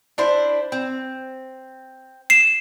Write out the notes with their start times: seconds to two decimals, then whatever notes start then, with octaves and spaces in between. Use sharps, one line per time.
0.18 D4 E4 C5
0.72 C4
2.30 C7 E7